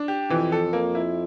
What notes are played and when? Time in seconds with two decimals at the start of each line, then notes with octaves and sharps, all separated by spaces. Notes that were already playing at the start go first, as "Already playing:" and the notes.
Already playing: D4
0.08 G4
0.30 F2 E3
0.52 A4
0.73 A#3
0.95 E4